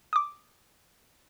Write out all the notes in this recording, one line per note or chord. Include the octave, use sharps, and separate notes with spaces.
D6 D#6